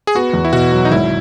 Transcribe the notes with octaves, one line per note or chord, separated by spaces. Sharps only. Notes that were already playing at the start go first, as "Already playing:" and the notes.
G#4
B3 F#4
E2
E4
B2 F#4
F#3
D#4
G#1 E4